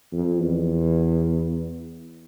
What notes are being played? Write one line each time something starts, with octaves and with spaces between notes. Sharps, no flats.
F2
E2